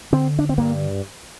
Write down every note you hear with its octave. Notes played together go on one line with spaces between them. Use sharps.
D3 C4
D4
C4
G2 A#3